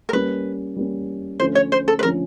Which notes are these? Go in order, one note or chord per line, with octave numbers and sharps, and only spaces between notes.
A#4
G3 A#3 C#4 B4
G3 A#3 C#4
D3 F3 A3 C#4 C5
C#5
C5
A4
B4
D3 F3 A3 C#4 A#4